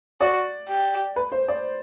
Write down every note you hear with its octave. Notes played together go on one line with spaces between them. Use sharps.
F#4 D5
G4
B4
C5
D5